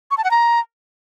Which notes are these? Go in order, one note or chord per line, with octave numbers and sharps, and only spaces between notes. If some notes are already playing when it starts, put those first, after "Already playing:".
C#6
A5
F#5
A#5